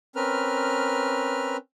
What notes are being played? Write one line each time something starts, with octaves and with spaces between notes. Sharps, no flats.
C4 C#4 A#4 B4 F6